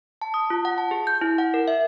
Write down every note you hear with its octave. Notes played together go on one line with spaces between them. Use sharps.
A5
D#6
F4
F#5
A5
G#4
G6
E4
F#5
A#4
E5